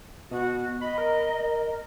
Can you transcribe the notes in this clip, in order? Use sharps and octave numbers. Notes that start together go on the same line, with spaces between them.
B2 F#4
D#5 B5
A#4